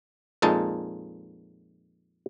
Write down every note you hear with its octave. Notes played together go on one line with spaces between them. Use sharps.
F2 A#2 G#3 D#4 A5